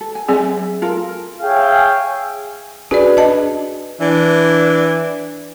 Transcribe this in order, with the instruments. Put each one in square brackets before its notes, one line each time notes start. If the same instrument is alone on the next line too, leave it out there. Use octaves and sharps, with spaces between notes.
[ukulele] A4
G#5
[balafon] F#3 C4 G#4 [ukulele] E5 G#5
[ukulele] F4 A4 A#4
[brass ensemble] G#4 C#5 E5 F5 G5 G#5
[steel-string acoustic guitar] D4 G#4 B4 [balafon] F#4 D5
[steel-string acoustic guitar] D4 [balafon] D#5 A5
[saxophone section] E3 D4